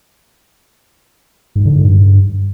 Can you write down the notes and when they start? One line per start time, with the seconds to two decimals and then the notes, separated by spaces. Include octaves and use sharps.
1.56 G#2
1.65 D3
1.75 G#2
1.85 G2